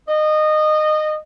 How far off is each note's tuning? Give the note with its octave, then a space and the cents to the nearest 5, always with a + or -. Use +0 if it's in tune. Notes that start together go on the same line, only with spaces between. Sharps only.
D#5 -20